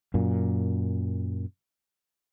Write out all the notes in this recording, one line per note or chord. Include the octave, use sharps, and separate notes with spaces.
F#2 A#2